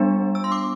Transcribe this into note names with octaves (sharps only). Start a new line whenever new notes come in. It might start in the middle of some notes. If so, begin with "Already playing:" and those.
Already playing: G3 B3 D4
E6
C6
D6